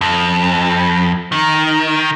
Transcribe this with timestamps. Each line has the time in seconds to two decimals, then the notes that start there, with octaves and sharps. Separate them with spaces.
0.01 F2
1.32 D#3